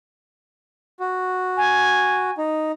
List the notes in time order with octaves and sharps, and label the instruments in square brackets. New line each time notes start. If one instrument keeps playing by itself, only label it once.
[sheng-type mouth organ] F#4
[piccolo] G#5
[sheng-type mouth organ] D#4